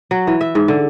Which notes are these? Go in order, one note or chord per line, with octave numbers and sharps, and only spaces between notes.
F#3
E3
E5
G#2
D3